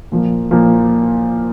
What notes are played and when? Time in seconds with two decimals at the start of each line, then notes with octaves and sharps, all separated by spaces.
0.12 A#2 F3 A#3
0.51 A#2 F3 A#3